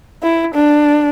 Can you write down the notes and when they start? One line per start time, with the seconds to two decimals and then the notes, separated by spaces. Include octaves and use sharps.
0.23 E4
0.54 D4